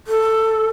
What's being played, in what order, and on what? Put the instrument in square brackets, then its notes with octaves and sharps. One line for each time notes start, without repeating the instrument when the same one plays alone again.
[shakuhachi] A4